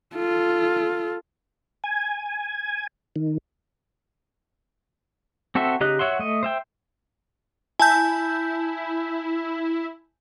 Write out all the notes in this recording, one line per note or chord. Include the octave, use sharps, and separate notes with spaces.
F4 A4
G#5
D#3
C4 F#4 A4 C5 E5
C#3 D#4 G4 D#5 F#6
F#4 C#5 E5 F#5 C6
A3 D#5
C5 E5 G5
E4 G#5 A5 G6